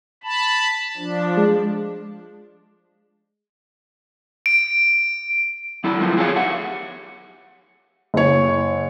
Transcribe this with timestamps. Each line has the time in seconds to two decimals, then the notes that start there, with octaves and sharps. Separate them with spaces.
0.23 A5 B5
0.97 F3 D4
1.37 G#3
4.46 D7
5.84 F#3 E4 A4
6.00 F3 A3 B3 F4 A#4
6.17 F#4 G#4 A4 C#5 F5
6.36 G4 E5 F#5
8.14 F#1 C#5